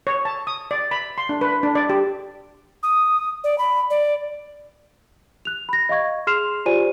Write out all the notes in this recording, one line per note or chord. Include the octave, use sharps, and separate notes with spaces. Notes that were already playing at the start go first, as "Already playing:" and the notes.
C#5
A5
D#6
D5
B5
C6
D4
B4
D4
D5
G4
D#6
D5
B5
D5
F#6 F7
B5 A#6
D#5 F5 C#6 G#6
G#4 C6 F6 C7 E7 F7
F4 G4 C5 D5 G#5 D#7